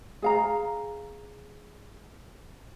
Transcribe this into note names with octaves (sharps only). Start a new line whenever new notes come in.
G#4 F5 A#5